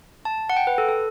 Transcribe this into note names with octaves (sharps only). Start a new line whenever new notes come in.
A5
F#5
G5
B4
A4
A4